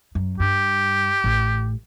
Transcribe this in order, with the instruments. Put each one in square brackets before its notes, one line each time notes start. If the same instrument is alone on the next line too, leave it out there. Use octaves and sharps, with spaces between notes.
[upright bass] F#2
[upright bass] G2 [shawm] G4
[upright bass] A1